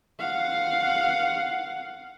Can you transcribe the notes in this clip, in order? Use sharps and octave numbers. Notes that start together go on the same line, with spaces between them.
F5 F#5